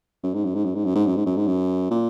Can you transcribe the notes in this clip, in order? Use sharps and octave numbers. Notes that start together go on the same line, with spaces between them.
F#2
G#2
F#2
G#2
F#2
G#2
F#2
G#2
F#2
G#2
F#2
G#2
F#2
A#2